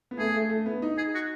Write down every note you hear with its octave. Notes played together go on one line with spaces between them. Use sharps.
B3
A3 G#4
A3
A3
B3
D#4
G#4
F#4